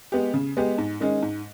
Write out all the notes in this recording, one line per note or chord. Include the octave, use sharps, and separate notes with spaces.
G#3 B3 G4
C#3
G#3 B3 G4
G#2
D#3 G#3 C#4
G#2